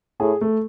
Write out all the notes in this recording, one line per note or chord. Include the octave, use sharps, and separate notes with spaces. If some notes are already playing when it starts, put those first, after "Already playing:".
A2 G#4
A3